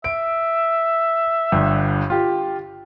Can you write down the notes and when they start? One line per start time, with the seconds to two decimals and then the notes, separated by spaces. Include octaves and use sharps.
0.04 E5 D7
1.52 G1 G2
2.10 F4 G4